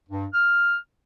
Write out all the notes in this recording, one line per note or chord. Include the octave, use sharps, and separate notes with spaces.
G2
F6